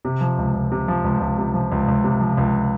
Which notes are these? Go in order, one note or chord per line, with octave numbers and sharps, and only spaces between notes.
C3
F3
C#2
C#2
C3
F3
C#2
C#2
C3
F3
C#2
C#2
C3
F3
C#2